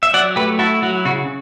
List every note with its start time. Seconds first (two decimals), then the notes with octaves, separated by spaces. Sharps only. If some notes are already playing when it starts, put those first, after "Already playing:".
0.03 E5
0.14 F#3 D5 F#5
0.36 A3 G4 B4
0.59 E4 F#4 A4
0.82 F#3 F#4
1.05 C#3 F#4